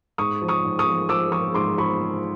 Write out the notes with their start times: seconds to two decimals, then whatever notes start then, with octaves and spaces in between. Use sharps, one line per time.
0.18 G#2 C#6 D#6
0.42 F3
0.48 C#6 D#6
0.64 G#2
0.79 C#6 D#6
0.87 F3
1.09 F3 D6 E6
1.32 F3 C#6 D#6
1.54 G#2 C6 D6
1.78 F3 B5 C#6